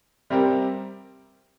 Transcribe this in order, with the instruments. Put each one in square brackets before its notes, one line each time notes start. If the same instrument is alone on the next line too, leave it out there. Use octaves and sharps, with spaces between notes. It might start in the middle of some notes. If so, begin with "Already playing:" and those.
[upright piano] C3 G3 C4 G4 A#4